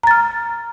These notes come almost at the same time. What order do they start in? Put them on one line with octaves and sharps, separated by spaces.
A#5 A6 F6